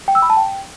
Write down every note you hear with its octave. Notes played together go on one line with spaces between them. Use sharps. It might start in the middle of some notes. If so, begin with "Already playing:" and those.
G5
E6
B5
A5
G5